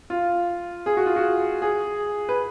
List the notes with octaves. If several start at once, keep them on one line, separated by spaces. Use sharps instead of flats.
F4
G#4
F#4
F4
F#4
G#4
B4